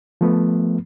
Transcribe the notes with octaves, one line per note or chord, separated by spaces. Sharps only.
F3 A3 B3